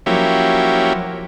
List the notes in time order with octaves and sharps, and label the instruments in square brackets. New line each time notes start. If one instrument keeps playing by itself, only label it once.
[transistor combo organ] F3 F#3 A#3 C#4 E4 G4